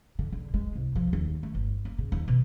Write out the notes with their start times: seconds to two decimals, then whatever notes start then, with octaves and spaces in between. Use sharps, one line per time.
0.19 D3
0.32 D3
0.54 G#3
0.75 C2
0.95 F3
1.13 D#2
1.43 A3
1.55 G1
1.85 A#3
1.98 C#3
2.12 D#2
2.28 B2